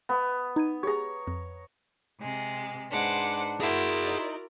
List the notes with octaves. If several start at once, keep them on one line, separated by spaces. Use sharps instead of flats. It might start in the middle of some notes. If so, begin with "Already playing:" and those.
B3
D#4 G#6 D#7
G4 G#4 C#5 A#5
F2
C3 G#3
G#2 G#3 D4 B4 C5 F#5 D6
E4 F#4 G#4 A#4 D5 F#5 C6
D#4